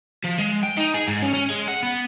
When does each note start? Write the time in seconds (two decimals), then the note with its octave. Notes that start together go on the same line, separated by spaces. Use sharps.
0.24 F3
0.39 G#3
0.63 G5
0.77 D#4
0.94 G#4
1.08 G#2
1.22 C#4
1.34 C#4
1.50 G#3
1.68 F#5
1.83 B3